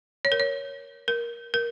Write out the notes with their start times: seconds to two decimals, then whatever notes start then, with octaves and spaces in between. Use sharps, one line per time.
0.25 C#5
0.32 A#4
0.40 C#5
1.08 A#4
1.54 A#4